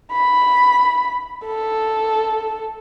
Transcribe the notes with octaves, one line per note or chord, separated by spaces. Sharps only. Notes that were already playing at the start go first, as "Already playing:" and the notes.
B5
A4